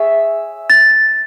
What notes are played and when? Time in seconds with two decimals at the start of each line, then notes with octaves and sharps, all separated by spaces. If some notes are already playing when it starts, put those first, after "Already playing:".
Already playing: G#4 C#5 E5
0.70 A6